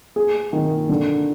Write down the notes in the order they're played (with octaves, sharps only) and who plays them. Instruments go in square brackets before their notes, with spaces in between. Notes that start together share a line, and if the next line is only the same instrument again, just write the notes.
[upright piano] G#4
D#3
D3